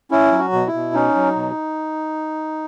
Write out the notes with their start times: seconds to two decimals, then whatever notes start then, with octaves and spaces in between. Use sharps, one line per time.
0.11 C#4 E4
0.32 F#3
0.39 F#4
0.53 B2
0.67 E4
0.73 B2
0.94 C#4 D#4
1.15 F#3
1.36 B2